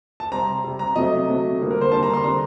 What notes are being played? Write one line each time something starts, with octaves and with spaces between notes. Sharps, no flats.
A5
C3 G3 C4 A#5
C3 G3 C4
A#5
C3 F#3 A3 D#5
C3 F#3 A3
D3 G3 A#3
A#4
C5
D3 G3 A#3 A5
A#5
C6
D3 G3 C4 A#5